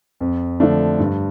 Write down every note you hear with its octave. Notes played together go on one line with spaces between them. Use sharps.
F2
D3 F3 A3 D4
G2